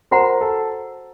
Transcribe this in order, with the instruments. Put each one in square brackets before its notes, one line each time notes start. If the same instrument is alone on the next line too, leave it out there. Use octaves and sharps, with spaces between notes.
[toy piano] F#4 C5 F#5 A#5 [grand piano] A#4
[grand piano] A4